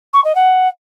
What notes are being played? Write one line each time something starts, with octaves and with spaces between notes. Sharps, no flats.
C#6
D#5
F#5